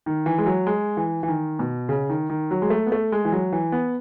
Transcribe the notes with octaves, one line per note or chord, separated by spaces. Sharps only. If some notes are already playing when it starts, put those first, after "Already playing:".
D#3
E3
G#3
F#3
G#3
E3
E3
D#3
B2
C#3
D#3
D#3
F#3
G#3
A3
B3
A3
G#3
E3
F#3
E3
B3